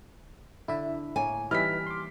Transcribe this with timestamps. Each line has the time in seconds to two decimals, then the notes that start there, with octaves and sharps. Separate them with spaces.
0.68 D3 E4 E5
1.16 A2 A#3 C#5 G#5
1.51 E3 G3 D#4 G4 B4 E5 F6 B6
1.87 C6 D6